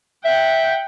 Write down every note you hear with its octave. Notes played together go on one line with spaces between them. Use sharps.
E5 F#5 G5